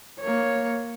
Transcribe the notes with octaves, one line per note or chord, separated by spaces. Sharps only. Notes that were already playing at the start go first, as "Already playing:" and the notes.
A#3 C#5